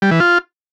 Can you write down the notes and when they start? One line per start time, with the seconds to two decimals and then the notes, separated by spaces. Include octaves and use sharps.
0.02 G3
0.11 E3
0.20 F4